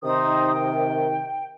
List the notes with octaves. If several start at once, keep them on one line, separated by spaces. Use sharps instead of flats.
C3 D#3 D#4 C5 D#6
G5